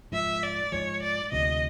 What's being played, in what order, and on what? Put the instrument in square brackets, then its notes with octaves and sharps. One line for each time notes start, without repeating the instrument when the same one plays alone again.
[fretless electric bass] G#2 F3 G#3 [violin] E5
[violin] D5
[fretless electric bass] G#2 F3 G#3 [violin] C#5
[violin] D5
[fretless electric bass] D2 C3 F3 [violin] D#5